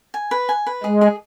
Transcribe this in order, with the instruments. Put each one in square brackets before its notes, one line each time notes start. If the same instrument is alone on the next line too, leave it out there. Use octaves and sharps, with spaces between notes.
[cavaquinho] G#5
B4
G#5
B4
[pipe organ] G#3 [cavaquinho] G#4
[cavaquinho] G#4